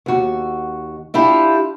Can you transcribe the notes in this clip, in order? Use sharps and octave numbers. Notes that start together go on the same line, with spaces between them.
D#2 F#4
D4 E4 F4 G4